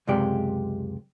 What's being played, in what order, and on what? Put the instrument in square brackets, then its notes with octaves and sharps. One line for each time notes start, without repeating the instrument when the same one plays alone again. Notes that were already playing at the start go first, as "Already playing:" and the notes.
[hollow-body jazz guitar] C#2 F#2 C3 G#3 G4 D5